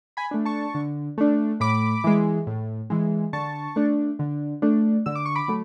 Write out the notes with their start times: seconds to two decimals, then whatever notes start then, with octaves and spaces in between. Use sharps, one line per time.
0.17 G#5 B5
0.31 A3 D4
0.45 A5 C#6
0.74 D3
1.18 A3 D4
1.60 A2 B5 D6
2.04 E3 G#3
2.47 A2
2.90 E3 G#3
3.33 D3 A5 C#6
3.76 A3 D4
4.19 D3
4.62 A3 D4
5.06 D3 E6
5.15 D6
5.25 C#6
5.35 B5 D6
5.48 F#3 A3